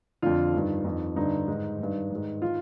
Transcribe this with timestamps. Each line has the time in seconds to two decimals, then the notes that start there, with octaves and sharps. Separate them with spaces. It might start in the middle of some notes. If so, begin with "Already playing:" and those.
0.22 F2 D3 F4
0.53 G2 D#3
0.84 F2 D#3
1.16 G2 D3 D#4
1.48 G#2 D#3
1.79 G2 D#3
2.10 G#2 D#3
2.42 D#3 F4